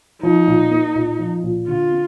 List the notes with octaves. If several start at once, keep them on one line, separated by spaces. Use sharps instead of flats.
F3 D#4
A#2
A#3
A#2
F3
A#2
D3 F4
C4